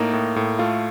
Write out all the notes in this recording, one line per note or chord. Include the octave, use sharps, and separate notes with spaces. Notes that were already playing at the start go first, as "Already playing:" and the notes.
Already playing: A2 A#3 D#4
A2
A2
A3 F4